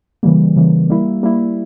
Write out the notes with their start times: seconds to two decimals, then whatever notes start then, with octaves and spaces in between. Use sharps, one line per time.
0.23 C#3 E3 G3 A#3
0.56 C#3 E3 G3 A#3
0.90 G3 A#3 E4
1.23 G3 A#3 E4